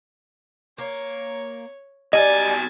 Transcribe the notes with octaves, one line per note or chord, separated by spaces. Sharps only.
A#3 C#5
B1 G3 D#4 D#5 G#5 G#6 A6